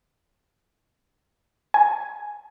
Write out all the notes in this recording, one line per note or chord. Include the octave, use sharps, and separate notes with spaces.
G#5